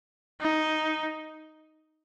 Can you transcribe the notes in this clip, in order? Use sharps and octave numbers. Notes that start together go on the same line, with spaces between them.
D#4